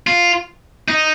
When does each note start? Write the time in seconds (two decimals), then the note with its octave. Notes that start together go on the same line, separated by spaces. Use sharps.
0.07 F4
0.88 D#4